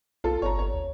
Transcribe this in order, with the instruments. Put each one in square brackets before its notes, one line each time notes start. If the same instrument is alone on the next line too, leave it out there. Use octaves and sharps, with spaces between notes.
[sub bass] B1 [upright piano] F4 A4
[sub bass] G1 [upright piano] C#5 A#5
[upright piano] C#5
[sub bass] D2